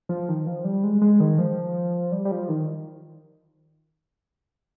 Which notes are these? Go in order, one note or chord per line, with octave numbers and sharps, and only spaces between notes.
F3
D#3
F3
G3
G#3
G#3
D#3
F3
G3
G3
F3
D#3